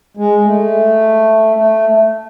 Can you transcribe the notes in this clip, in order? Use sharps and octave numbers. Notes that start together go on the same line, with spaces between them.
G#3
A3
A3